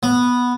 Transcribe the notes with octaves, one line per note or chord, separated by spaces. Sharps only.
B3